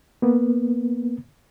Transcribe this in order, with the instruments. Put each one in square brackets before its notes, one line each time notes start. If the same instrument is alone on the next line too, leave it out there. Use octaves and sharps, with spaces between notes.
[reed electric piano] A#3 B3